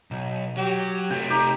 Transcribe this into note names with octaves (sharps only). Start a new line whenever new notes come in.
B1
F#3 G4
C3 A3 G5
D#4 G4